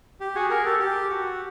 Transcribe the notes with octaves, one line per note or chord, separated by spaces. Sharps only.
G4
F#4 G#4
G#4 A#4
G4 A4
G4
F#4